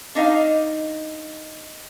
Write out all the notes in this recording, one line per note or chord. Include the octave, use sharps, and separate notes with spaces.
D4 D#4 D#5 F5